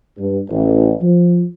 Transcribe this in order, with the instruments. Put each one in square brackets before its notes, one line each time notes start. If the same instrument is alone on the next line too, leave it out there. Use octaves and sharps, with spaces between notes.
[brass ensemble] G2
A1
F3